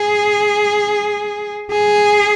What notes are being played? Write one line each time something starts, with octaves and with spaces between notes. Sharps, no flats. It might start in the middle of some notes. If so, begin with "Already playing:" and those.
Already playing: G#4
G#4